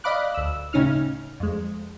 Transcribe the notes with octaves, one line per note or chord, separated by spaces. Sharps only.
D5 D#5 F5 B5 D6 F#6
D2 E6
A2 C#3 C#4 D#4 F6
F2 G#3